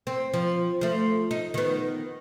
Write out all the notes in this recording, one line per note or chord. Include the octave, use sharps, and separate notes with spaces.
C4
F3
F3 A3
D#4
D#3 B3